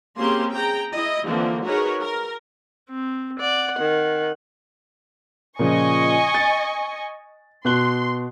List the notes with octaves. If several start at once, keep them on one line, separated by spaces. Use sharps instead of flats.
A#3 C4 C#4 G4 G#4 C6
G#4 G5 A#5
E4 D#5
D3 E3 F3 A#3 C4
D#4 F#4 G#4 A#4 B4 C#5
A#4
C4
D5 F#5
D#3
A#2 C#3 F3 D#5 G#5 C#6
A6
B2 C6 F#6 G7